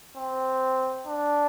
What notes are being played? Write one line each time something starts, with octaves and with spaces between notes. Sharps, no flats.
C4
D4